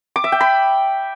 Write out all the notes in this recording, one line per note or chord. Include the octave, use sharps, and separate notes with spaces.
D6
E5
G5
B5